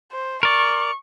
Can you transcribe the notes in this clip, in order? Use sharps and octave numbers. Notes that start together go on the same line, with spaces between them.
C5
A#4 D5 C#6